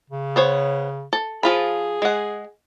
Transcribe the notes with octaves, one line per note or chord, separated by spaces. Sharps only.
C#3
B3 C5 C#5
A4
F3 F4 G#4 B5
G#3 F#5